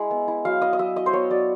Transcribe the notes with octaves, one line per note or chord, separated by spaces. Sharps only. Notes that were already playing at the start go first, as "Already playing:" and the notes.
Already playing: G#3 E4
B3
E4
F#3 F5
E4 D#5
D#5
F#3 E5
E4 D#5
C5
B3 C#5
F#3 D5